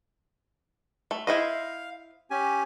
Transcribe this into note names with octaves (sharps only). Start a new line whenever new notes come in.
A3
E4 C5 D#5 F5
C#4 G4 G#5